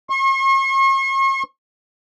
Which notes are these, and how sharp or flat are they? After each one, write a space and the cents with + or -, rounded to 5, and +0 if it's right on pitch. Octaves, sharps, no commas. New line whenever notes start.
C#6 -45